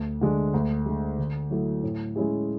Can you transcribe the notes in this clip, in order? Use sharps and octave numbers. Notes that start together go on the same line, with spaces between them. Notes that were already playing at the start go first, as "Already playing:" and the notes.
Already playing: D2
D3 G#3 D4
D2
D3 G#3
D3
F#3 A3 E4 A4
A2
G#3 C#4 E4 G#4